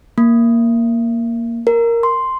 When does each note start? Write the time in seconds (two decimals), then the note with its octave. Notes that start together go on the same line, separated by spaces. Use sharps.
0.18 A#3
1.67 A#4
2.03 C6